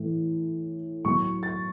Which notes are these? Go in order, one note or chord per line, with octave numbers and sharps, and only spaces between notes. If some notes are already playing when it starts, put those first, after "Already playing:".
Already playing: A2 E3 A3
A2 F#3 A3 C#6
A6